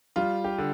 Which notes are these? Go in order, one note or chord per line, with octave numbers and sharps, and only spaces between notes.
G3 F4
G4
D3